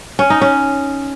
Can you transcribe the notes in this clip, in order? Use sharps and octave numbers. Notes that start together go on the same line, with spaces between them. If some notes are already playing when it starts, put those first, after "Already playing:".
C#4
D#4
C#4